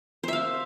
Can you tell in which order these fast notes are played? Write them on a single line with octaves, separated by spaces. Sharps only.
C5 E5 F5